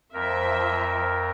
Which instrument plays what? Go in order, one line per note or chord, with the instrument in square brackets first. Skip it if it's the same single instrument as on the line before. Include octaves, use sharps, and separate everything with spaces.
[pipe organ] F2 A#4 [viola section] F3 E5